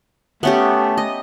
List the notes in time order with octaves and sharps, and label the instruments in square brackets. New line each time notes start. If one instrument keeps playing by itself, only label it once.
[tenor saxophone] A3 [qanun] B3 C#4 G4
[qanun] D#5